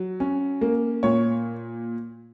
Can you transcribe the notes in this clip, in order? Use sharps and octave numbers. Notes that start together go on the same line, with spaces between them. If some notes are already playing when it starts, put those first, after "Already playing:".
Already playing: F#3
C#4
A#3
A#2 C#5